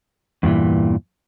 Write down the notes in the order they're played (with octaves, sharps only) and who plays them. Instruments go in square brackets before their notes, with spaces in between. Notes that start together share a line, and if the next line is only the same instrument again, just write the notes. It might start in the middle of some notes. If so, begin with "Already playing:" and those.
[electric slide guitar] E2 G2 A#2 E3